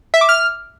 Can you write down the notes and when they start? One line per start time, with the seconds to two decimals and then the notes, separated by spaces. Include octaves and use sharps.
0.14 E5
0.21 D6
0.29 F6